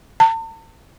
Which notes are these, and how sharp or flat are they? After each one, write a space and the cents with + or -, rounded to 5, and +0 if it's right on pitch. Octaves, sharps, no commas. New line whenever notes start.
A5 +45